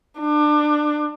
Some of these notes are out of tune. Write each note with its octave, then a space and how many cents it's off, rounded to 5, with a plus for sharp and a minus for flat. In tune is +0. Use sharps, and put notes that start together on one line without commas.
D4 +25